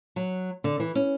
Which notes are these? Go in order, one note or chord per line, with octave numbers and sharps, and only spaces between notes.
F#3
D3
E3
C#4